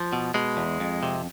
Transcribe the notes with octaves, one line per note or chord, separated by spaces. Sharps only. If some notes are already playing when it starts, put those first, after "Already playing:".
Already playing: F3
B2
B2 G#3
E2
F2
C3